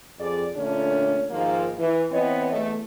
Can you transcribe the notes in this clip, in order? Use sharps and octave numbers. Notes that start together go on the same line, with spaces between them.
F2 G#4 D5
A#2 D3 A3 C#4 D4 A4
G#2 D#3 F3 A#3 F4
E3
E3 B3 C4 C#5 D#5
E2 A3